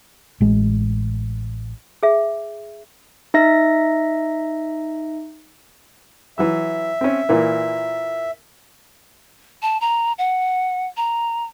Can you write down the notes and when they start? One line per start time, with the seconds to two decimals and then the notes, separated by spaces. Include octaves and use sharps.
0.41 A1 G#3
2.03 G#4 E5
3.34 D#4 E5 A#6
6.38 E3 F#3 E5 E6
7.01 C4 C#4
7.29 A#2 E3 A#3
9.62 A5
9.81 A#5
10.18 F#5
10.97 A#5